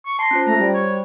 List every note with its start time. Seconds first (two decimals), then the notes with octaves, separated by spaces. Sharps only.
0.05 C#6
0.19 A5 C6 A#6
0.31 C#4 F4 C5
0.46 A3 A#5
0.59 G3 F#4 C5
0.74 C#5